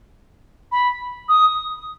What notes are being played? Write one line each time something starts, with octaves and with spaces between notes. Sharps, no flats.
B5
D#6